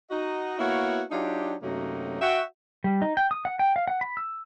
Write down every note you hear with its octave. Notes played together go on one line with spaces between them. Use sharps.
D#4 F#4 D#5
A#3 B3 E4 F#4 C#5
F#3 D4 D#4 F4 G4
F#2 C3 F#3 A3 A#3 D#4
F#4 E5 G5
G3
D#4
G5
D#6
F#5
G5
F5
F#5
B5
E6